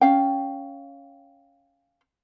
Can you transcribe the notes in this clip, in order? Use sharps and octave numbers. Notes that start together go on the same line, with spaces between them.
C#4 F5 G5